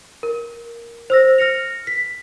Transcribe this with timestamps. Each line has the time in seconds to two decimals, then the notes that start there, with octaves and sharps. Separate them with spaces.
0.23 A#4
1.10 C5 E6 A#6
1.38 F6 A#6 C#7 F7
1.87 B6